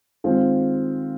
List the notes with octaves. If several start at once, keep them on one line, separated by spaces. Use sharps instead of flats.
D#3 G#3 C4 F4